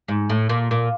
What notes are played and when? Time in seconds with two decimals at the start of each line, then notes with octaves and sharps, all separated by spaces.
0.08 G#2
0.30 A2
0.49 A#2
0.71 A#2